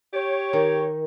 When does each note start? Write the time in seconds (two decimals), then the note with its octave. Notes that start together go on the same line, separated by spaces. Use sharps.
0.14 G4 C#5
0.53 D#3